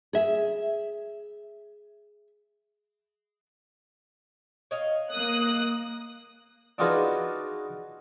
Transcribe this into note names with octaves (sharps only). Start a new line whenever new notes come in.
G#4 E5
C#5 D#5 F5
A#3 D#6 F#6
D4 D#4 F4 F#4 G#4 B4